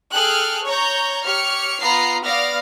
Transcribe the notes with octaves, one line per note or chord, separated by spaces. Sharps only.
G#4 A4 G5 F6 F#6
C#5 A#5 G6
G4 C#5 F6 C#7
B3 F4 A#5 C7
B3 D5 F5 F6 A#6